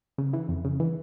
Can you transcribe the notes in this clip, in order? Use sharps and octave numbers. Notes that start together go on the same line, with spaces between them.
C#3
E3
F2
C#3
E3